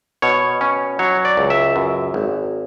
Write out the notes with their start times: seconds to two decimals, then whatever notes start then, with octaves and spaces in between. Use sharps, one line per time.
0.22 B2 C#5
0.61 C#4
0.99 F#3 C#5
1.25 D5
1.37 C#2
1.50 E5
1.76 F#2
2.14 G#1